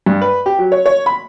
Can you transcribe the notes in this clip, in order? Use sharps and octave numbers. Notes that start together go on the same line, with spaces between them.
G2
B4
G4
F#3
C#5
C#5
B5